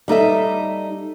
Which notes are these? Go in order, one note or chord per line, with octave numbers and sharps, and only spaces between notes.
G3 D#4 A4 E5